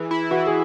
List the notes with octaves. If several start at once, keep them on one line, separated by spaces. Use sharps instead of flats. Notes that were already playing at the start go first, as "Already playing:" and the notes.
Already playing: E3 G#4
E4
E3 F#4
G#4